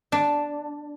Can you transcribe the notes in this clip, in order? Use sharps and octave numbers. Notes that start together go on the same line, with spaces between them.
D4